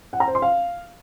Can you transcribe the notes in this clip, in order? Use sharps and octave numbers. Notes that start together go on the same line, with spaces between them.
F#5
A#5
C5
C6
F5